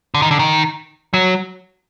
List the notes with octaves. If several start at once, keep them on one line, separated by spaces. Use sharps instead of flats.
D3
D#3
D3
D#3
F#3